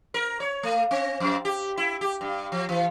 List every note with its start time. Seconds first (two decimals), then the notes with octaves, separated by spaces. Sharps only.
0.14 A#4
0.40 C#5
0.63 A3
0.91 C4
1.20 F2
1.45 G4
1.77 E4
2.01 G4
2.21 G2
2.52 F3
2.69 E3